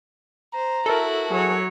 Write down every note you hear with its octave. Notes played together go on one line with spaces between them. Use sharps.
C5 A#5
E4 F#4 A4 A#4
F#3 G#4 C#5